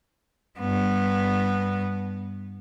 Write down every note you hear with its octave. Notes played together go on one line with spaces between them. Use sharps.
G2 B3